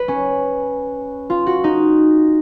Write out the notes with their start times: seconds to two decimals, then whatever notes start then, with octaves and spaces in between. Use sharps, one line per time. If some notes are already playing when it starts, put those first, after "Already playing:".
Already playing: B4
0.08 C#4
1.30 F4
1.47 F#4
1.64 D#4